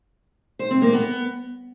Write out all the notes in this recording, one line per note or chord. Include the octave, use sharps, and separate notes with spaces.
C5
C4
A#3
B3